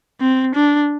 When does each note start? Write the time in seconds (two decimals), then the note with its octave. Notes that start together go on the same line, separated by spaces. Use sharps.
0.21 C4
0.55 D4